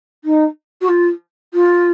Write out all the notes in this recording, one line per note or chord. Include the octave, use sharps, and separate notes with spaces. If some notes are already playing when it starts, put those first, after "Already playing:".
D#4
F#4
F4
F4